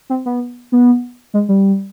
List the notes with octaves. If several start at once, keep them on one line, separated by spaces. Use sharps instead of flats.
C4
B3
B3
G#3
G3